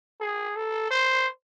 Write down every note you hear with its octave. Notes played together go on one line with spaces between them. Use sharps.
G#4
A4
C5